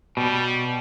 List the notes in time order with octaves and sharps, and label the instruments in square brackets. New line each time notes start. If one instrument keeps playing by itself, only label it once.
[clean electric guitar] B2 [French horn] G3